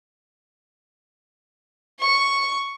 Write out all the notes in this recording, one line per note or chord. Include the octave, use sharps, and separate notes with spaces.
C#6